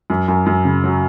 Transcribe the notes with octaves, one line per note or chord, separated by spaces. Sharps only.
F#2
F#2
F#2
C#3
F#3